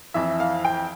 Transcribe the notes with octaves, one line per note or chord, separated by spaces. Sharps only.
F2 E3 E5
F5
G5